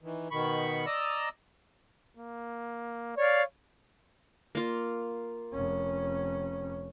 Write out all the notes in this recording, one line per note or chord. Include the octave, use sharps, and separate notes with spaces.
D#3 E3
B2 D#3 B5 C#6
D5 D#5 A#5 E6
A#3
C#5 D5 F5
A#3 F4
F1 C#4